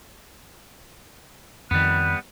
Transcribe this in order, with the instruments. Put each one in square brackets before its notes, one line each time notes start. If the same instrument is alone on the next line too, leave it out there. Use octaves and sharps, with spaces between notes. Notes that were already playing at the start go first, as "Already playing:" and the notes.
[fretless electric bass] F2 D#3 [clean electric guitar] G3 B3 [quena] F#6